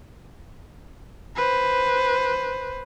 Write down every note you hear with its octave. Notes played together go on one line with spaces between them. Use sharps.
B4 C5